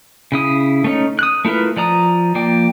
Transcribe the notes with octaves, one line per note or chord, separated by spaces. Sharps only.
C#3 E4 D#6
A3 C#4 D#4
D#6 F#6
A3 E4 F4 A#4 B4
F3 D5 A#5 D#6
F3 A#3 D5 G5